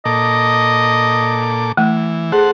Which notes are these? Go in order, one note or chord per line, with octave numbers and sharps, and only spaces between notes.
A#2 A4 D#5 D6
E3 A3
G#4 A4 C5 F#5